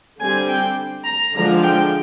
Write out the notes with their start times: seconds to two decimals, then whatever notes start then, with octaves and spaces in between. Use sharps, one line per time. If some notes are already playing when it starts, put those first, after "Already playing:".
0.20 D3 G3 C4 G#5
0.48 G5
1.05 A#5
1.34 D3 F3 G#3 D4 A#5
1.63 G5